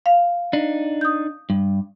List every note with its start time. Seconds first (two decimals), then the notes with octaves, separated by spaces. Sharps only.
0.06 F5
0.53 D4 D#4
1.01 D#6 G6
1.50 G2